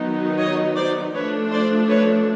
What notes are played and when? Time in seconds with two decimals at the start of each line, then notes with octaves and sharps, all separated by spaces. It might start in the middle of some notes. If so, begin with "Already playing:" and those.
Already playing: D#3 F#3 B3 D#4
0.38 C#5 D#5
0.76 C5 D5
1.14 F3 A3 D4 B4 C#5
1.51 C5 D5
1.88 B4 C#5